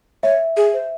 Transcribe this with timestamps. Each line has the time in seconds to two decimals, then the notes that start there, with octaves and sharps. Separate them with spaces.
0.23 C#5 E5
0.57 G#4
0.73 C5